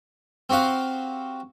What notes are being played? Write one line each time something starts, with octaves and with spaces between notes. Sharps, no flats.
C4 F#4 G4 F5 F#5